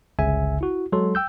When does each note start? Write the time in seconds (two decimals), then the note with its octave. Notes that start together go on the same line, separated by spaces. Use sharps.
0.19 G1 C#2 C#3 E5 G#5
0.61 E4 F#4
0.92 F#3 G#3 A4 C6
1.15 G5 E6 G6